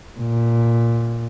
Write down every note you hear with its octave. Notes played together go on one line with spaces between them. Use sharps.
A#2